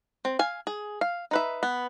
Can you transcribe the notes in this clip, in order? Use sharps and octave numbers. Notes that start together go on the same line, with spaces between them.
C4
F5 G#5
G#4
F5
D#4 B4 E5
B3